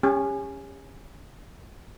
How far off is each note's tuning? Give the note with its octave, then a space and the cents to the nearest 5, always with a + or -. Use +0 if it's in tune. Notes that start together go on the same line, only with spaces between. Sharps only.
C#4 +0 G4 +45